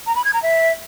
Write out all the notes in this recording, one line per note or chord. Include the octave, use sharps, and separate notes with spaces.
A#5
B5
G#6
A#5
E5